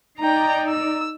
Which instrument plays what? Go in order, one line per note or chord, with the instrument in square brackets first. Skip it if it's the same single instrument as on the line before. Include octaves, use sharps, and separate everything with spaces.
[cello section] D#4 D5 [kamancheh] G5 A#5
[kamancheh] E6